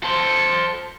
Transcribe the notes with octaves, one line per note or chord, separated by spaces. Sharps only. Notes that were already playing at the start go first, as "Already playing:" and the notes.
A4 C5